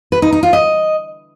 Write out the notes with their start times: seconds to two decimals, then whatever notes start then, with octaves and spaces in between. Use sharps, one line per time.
0.12 B4
0.22 D#4
0.32 D#4
0.43 F4
0.53 D#5